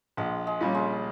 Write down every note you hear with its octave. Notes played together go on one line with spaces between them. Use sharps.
A#1 G#3
G#3
A#2 G3 C#4
G#3